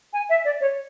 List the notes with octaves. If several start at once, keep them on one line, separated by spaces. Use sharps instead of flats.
G#5
E5
D5
C#5